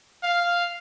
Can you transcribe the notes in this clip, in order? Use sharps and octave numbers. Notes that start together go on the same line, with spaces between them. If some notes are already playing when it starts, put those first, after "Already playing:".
F5